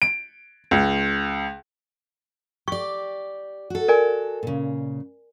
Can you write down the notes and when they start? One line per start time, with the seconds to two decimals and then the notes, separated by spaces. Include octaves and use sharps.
0.02 D7
0.71 C#2
2.68 G4 D5 C#6
3.70 F#4 A4
3.88 A#4 D5 G#5
4.43 A#2 C#3